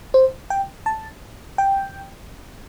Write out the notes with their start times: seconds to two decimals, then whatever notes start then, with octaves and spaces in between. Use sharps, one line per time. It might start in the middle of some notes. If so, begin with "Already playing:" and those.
0.14 C5
0.50 G5
0.86 A5
1.58 G5